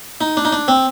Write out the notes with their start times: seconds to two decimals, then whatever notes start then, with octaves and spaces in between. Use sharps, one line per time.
0.21 D#4
0.37 D4
0.45 D#4
0.52 D4
0.68 C4